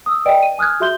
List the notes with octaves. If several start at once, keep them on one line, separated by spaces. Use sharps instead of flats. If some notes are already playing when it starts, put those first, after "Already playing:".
D#6 E6
B4 D5 D#5 G5 D7
D#7
G#5 D#6 F6 F#6 G#6
F#4 G#4 E5 C6 G6 G7